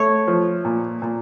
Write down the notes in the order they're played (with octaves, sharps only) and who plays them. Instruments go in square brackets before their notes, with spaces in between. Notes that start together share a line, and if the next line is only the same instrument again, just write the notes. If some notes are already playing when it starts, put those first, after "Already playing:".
Already playing: [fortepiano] A3 [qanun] C#5
[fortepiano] F3
A#2
A#2